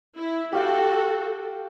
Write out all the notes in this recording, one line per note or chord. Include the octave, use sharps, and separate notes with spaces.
E4
F#4 G4 A4 F5 G5